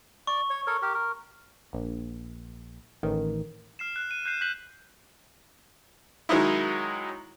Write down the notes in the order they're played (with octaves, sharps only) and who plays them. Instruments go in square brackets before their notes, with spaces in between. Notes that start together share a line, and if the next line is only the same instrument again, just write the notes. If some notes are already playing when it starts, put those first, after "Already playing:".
[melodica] D5 [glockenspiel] C#6
[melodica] C#5
A4 A#4 C#5
G4 A#4
A#4
[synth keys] A#1
A1 D#3
[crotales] F6 C7 E7
F#6
D#7
F#6 G6 C7 E7
F#6 G6 B6 F#7
[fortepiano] D#3 F#3 G#3 D#4 E4